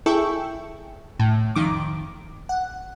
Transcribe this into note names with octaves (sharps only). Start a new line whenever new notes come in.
E4 G#4 A4 E5 G5 C#6
A2
F2 D#3 D6
F#5